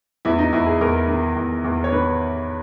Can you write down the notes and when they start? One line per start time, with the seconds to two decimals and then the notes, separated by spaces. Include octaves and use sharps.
0.25 E2 E4
0.38 D#4
0.53 E2 E4
0.66 G#4
0.81 E2 A#4
1.08 D#3
1.36 E2
1.64 E2
1.84 C#5
1.92 D#3 B4